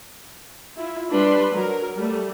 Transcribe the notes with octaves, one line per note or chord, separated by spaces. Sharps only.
E4 F4
G3 D4 B4 B5 C6
F#3 A#4
G3 A3